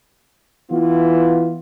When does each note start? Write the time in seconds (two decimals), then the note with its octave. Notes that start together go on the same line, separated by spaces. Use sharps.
0.71 E3 B3 F4